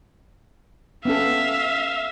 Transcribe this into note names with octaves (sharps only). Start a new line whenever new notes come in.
B3 C#4 A4 E5 F5